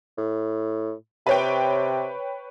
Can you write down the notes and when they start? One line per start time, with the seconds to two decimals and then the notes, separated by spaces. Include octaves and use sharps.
0.18 A2
1.27 C3 B4 C#5 G5